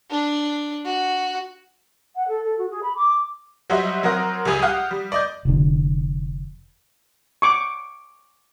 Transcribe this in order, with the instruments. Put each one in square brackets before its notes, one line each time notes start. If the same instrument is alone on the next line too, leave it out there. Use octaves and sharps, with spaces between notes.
[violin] D4
F#4
[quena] F#5
A4
A4
F#4
G#4
B5
D6
[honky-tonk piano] F#3 G3 F#4 C5 D#5 E5
F#3 C4 A#4 F#5 D#6 A#6
C#2 G3 G#4 D#6
G4 F5 F#5 D#6
G3
D5 D#5 G6
[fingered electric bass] F1 D3
[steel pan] C#6 D6